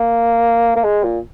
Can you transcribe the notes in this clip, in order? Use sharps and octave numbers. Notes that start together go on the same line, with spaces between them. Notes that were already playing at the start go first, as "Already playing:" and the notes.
Already playing: A#3
A#3
G#3
A#2